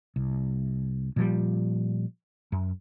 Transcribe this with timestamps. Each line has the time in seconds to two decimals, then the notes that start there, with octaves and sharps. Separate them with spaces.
0.16 C2
1.16 A#2 F3 G3
2.52 F#2